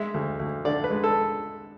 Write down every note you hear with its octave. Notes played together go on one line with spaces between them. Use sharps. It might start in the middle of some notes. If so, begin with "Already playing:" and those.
Already playing: G#3 E5
D2
D2
D3 D5
B4
G#3
A4